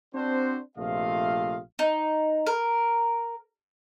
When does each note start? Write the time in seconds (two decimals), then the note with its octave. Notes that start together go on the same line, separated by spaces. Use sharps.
0.15 C4 D4 F#4 C5
0.78 A#1 C3 A3 F4 D#5 F5
1.79 D#4
2.47 A#4